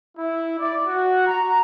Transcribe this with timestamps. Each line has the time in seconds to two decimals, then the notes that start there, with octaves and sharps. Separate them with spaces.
0.16 E4
0.59 D5
0.87 F#4
1.26 A#5